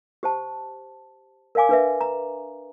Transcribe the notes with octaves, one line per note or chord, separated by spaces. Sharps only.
G4 C5 A5
A#4 D5 F5 G#5 D6
D4 B4 E5
A#5